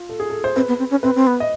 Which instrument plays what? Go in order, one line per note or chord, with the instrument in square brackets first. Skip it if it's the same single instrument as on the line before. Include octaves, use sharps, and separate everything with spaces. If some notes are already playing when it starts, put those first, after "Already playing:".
Already playing: [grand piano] F4
A4
G#4
A4
C5
[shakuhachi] C4 [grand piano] B4
[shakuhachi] B3
C4
C#4
[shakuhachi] C4 [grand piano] B4
[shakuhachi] C4
B3
[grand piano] D#5